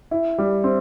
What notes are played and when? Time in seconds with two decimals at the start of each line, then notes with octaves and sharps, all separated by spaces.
0.11 E4
0.38 G3
0.64 C4